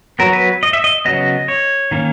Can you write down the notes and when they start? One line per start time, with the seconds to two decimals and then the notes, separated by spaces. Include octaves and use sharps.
0.19 F#3 B3 A#4
0.33 B4
0.63 D#5
0.73 E5
0.84 D#5
1.05 C#3 F#3 B3 D#5
1.48 C#5
1.91 D#3 A#3 C#4